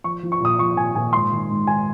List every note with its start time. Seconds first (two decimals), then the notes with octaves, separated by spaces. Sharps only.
0.04 F3 C#6
0.23 F3
0.32 C#6
0.40 A#2 D#6
0.59 F3 C#6
0.76 A#2 G#5
0.95 A#2 G#5
1.13 G#2 C6
1.32 D#3
1.50 G#2
1.67 D#3 G#5